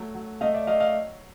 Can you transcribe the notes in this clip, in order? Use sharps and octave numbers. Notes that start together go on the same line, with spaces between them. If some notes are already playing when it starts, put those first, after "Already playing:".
Already playing: F#3 A3
F#3
A3 D#5 F5
D5 E5
F#3 D#5 F5
D#5 F5